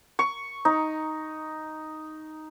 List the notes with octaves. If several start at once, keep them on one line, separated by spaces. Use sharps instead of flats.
C#6
D#4